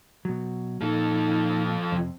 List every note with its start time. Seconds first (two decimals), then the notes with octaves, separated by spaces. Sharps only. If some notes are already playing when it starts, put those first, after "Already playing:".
0.25 B2 F#3
0.81 A#2 F3 D#4 A4
1.92 F2 C3